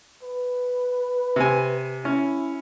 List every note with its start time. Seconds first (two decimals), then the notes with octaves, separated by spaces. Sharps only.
0.23 B4
1.36 C3 G#5
2.05 C#4 E4